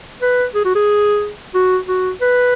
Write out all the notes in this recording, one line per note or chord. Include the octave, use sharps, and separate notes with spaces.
B4
G#4
F#4
G#4
F#4
F#4
B4